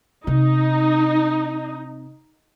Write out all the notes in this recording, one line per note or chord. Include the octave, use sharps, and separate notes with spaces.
C3 D#4